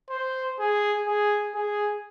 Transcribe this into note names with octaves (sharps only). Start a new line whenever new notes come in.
C5
G#4
G#4
G#4